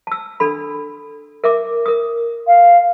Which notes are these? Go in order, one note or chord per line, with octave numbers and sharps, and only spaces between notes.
A5 E6
D4 A4 B5
A#4 E5 D6
A#4 D#6
F5